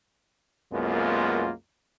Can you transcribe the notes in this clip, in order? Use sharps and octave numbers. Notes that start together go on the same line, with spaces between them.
C2 F#2 G#3 A#3 B3 F4